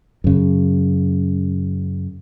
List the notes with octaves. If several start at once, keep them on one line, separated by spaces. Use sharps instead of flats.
F#2 C#3